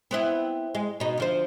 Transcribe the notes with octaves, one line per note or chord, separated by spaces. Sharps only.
B3 C4 E4
G#3
B2 D#4
D2 F3 C5